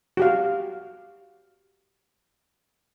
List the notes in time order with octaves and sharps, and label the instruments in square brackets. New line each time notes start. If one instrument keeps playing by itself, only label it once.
[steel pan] F#4 G4 F5